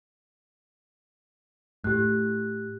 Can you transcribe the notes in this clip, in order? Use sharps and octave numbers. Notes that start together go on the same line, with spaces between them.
A2 G4 F#6